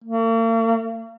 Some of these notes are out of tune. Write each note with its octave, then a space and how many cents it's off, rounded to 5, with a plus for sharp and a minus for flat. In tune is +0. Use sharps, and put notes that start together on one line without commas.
A#3 -45